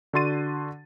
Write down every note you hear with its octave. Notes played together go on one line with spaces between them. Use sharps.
D3 D4 F#4 C6 A6 D#7